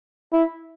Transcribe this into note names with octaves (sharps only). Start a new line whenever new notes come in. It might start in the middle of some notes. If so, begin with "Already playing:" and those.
E4